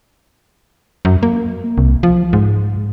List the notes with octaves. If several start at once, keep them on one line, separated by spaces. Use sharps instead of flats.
F#2
A#3
C2
F3
G#2